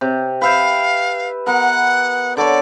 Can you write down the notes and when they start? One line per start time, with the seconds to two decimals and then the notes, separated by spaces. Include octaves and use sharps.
0.01 C3
0.42 B4 E5 F5 G5
1.47 B3 A#4 F#5
2.37 D3 A4 C#5 D5